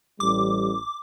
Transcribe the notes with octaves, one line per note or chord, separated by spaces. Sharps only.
A1 G3 D6